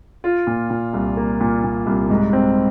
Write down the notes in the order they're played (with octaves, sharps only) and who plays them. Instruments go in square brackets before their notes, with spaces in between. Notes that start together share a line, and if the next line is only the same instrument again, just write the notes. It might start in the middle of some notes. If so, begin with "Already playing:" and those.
[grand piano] F4
A#2
A#2
C2
A#3
A#2
A#2
C2
G#2
C4